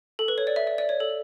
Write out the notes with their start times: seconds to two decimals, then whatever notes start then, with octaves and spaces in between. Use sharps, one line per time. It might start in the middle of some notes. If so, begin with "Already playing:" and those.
0.19 A4
0.28 B4
0.38 C#5
0.47 D5
0.56 E5
0.67 D5
0.78 D5
0.89 C#5
1.00 A4